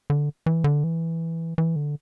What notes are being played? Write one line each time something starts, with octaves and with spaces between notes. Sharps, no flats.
D3
E3
D3
E3
E3
D3